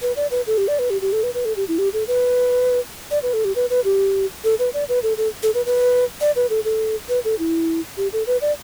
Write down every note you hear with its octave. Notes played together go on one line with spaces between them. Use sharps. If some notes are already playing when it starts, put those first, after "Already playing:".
B4
D5
B4
A4
G4
D5
B4
G4
G4
A4
B4
B4
A4
G4
E4
G4
A4
B4
D5
B4
A4
G4
B4
B4
G4
A4
B4
D5
B4
A4
A4
A4
B4
B4
D5
B4
A4
A4
B4
A4
E4
G4
A4
B4
D5